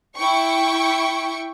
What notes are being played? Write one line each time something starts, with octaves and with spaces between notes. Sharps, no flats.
E4 G5 C#6